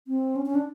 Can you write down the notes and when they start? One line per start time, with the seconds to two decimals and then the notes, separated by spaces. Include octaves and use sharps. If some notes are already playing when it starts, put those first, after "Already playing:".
0.08 C4
0.36 C#4
0.46 C#4
0.55 D4